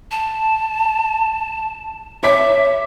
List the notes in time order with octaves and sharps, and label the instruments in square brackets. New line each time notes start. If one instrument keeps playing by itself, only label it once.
[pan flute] A5
[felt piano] C#5 D6 B6 [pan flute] E5